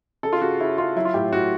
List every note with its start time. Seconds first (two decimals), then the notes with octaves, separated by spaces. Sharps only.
0.23 C#3 A4
0.33 F4
0.41 C#3 F#4
0.60 C#3 E4
0.78 C#3 F4
0.96 F#3 E4
1.05 F4
1.14 A2 G4
1.33 A2 F#4